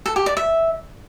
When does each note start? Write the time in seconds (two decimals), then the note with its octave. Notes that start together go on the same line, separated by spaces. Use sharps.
0.06 A4
0.16 G4
0.26 D5
0.37 E5